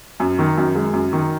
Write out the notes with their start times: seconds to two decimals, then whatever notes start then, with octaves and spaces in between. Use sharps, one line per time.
0.20 F#2
0.39 D#3
0.57 F#2
0.75 G#3
0.93 F#2
1.13 D#3